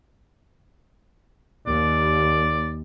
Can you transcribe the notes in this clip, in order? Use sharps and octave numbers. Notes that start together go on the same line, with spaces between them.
D#2 D5